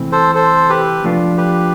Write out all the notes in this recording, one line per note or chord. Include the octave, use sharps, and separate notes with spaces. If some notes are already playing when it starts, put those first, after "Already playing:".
Already playing: C3 E3 A3 C4
A4 C5
A4 C5
G4 B4
F3 A3 D4 F4
G4 B4